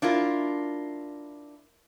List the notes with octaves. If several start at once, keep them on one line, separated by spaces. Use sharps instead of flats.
D4 E4 F4 A#4